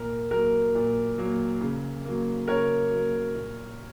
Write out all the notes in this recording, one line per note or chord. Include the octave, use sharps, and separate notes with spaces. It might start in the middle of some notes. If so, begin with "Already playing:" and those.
Already playing: A#2 A#4
F#3 A#3 A#4
A#2
F#3 A#3
C#3
F#3 A#3
C#3 A#4 C#5
F#3 A#3
A#2